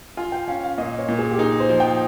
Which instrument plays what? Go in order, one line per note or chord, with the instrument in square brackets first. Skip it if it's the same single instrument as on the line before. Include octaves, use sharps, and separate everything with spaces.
[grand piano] F4 [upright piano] G#5
[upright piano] G5
[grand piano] C#4 [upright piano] F5
[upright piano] F5
[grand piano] A#2 [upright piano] D#5
[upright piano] C#5
[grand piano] A#2
[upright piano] G#4
G4
[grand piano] D#4 [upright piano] G#4
[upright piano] C5
[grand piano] F3
[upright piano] G5